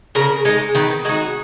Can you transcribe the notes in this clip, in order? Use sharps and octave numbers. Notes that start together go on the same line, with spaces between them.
C#3 A#4
G#3 D#4
D#3 B4
G#3 D#4 F#4